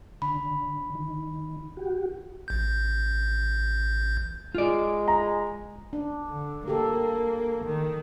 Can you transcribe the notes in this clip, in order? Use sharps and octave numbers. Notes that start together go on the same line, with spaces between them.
D3 B5
D#3
F#4 G4
A1 G6
G#3 F4 D5
A#5
D4
D3
A#3 G4 A4
D#3